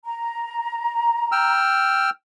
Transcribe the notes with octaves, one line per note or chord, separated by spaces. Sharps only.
A#5
G5 E6 F6